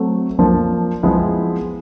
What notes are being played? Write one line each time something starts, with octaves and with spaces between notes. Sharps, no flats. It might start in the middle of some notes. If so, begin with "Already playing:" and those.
Already playing: F#3 A3 C4
F3 A#3 D4
F3 G#3 B3 E4 G#4